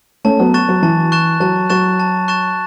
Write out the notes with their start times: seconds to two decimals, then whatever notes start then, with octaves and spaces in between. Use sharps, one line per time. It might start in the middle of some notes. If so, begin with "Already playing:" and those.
0.24 A3 C#4 A5
0.39 F#3 B3
0.54 C#6 F#6 A6 E7
0.69 F#3
0.82 E3 A5
1.12 C#6 F#6 A6 E7
1.40 F#3 A5
1.69 F#3 C#6 F#6 A6 E7
2.00 A5
2.28 C#6 F#6 A6 E7